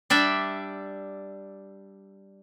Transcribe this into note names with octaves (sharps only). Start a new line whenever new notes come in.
G3 D4 E5